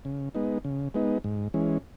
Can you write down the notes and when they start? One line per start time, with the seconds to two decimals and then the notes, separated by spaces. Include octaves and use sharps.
0.05 C#3
0.35 G#3 B3 D#4
0.65 C#3
0.94 G#3 B3 D#4
1.24 G#2
1.54 E3 G#3 C#4